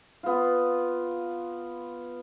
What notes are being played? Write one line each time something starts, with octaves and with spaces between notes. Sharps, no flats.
B3 F4